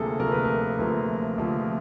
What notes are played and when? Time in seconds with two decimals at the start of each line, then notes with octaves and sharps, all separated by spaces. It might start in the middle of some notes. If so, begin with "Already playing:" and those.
Already playing: D2 C3 F3 A#3 G#4 A4
0.19 D2 C3 F3 A#3 A#4
0.32 B4
0.44 A#4
0.79 D2 C3 F3 A#3
1.38 D2 C3 F3 A#3